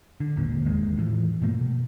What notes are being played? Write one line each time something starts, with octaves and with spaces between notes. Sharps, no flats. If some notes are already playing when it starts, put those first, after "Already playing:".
D3
G#1 D#2 A#2 D3
G#1 E2 D#3 G#3
A2 E3 F3
G2 A#2 A3 A#3
B2